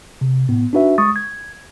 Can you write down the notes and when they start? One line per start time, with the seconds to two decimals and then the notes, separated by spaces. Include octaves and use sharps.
0.21 C3
0.49 A2 B3
0.73 D4 D#4 F#4 B4 E5
0.98 G#3 C#6 D#6 A6
1.16 G#6